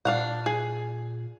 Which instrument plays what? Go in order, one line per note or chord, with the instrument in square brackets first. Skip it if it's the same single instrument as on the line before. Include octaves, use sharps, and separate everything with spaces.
[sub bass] A#2 [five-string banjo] D4 F5 F#5
[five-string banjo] G#4